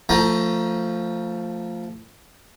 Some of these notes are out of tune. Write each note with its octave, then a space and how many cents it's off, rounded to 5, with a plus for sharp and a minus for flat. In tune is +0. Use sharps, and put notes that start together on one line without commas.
F3 +0 A3 +25 A#5 +20